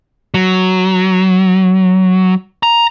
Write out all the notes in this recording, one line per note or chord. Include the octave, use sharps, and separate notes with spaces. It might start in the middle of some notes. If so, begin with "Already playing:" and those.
F#3
A#5